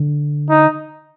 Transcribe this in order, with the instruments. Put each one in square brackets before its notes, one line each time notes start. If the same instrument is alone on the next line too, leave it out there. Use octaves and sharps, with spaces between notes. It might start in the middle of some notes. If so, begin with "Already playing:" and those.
Already playing: [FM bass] D3
[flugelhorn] D#4